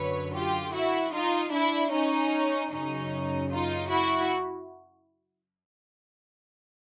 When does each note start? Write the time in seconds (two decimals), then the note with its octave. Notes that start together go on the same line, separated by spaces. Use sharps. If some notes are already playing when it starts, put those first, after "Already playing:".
Already playing: F#2 D3 F#3 B4 C#5
0.35 F4 G4
0.74 E4 F#4
1.13 D#4 F4
1.53 D4 E4
1.93 C#4 D#4
2.71 F#2 C#3 F#3 C#4 D#4
3.50 D#4 F4
3.90 E4 F#4